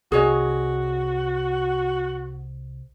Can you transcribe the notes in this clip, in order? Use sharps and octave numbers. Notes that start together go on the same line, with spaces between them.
C2 F#4 G#4 C#5 D#5